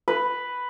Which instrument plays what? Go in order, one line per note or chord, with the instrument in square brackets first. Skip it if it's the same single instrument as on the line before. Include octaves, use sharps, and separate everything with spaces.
[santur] B4